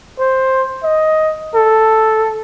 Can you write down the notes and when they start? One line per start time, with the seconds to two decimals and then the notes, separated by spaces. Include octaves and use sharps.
0.19 C5
0.83 D#5
1.54 A4